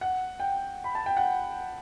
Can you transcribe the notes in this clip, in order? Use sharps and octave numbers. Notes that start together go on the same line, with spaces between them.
F#5
G5
B5
A5
G5
F#5